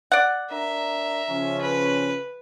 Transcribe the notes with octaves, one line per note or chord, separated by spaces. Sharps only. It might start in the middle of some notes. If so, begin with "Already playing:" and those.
D5 F#5
D4 A#4 E5 A#5
C#3 F3 C#4
B4